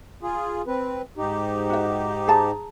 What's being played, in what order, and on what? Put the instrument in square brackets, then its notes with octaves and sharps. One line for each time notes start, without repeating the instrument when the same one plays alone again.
[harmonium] F4 G#4
C4 B4
G#2 D#4 G4
[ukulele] F#4 E5
G#4 A5 A#5